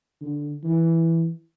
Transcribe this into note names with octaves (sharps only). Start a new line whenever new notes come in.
D3
E3